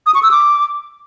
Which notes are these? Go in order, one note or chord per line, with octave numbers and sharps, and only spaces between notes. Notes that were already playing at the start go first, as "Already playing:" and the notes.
D#6
C#6
E6
D6